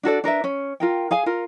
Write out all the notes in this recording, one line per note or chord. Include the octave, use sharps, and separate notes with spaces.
D4 F#4 A4 D5
D4 A#4 B4 E5
C#4
F4 A#4 G5
G#4 F5 G#5
F4 A#4